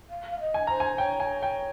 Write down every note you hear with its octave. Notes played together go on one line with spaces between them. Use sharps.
F5
F5
D#5
G#5
C5 A#5
G#5
C#5 G5
G#5
G5